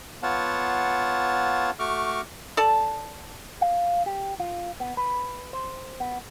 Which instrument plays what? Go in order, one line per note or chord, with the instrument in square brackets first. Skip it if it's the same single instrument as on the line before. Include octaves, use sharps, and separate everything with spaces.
[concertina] B3 F4 C#5 F5 F#5 A5
A3 F#4 C#6 D6 F6
[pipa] A4 D5 A5
[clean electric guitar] F5
G4
F4
B3
B4
C5
B3